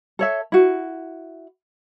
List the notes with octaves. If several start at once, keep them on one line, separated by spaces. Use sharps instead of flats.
A4 C#5 E5
E4 F#4